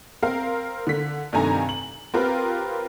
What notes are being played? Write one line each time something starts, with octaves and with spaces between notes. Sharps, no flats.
C4 A#4 F5
D3 B6
G2 C3 D#3 A3 G#5 A#5
F#7
C4 F4 G4 A#4 B4